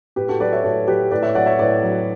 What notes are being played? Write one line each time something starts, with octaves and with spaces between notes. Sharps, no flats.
A2 G4 B4
F#4 A4
F#3 B4 D5
C#5 E5
A2 F#4 A4
F#3 G4 B4
A2 B4 D5
C#5 E5
F#3 D5 F#5
C#5 E5
A2 B4 D5
F#3